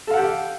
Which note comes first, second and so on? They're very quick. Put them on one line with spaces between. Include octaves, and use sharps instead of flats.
A4 F5 F#5 G4